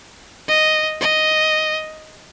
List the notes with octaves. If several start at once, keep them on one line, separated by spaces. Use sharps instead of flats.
D#5
D#5